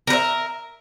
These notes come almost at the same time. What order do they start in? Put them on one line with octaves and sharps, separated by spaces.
A#4 B4 E5